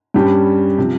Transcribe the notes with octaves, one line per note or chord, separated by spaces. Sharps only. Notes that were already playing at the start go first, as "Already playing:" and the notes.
G2 G3 C#4 G4
C3 F3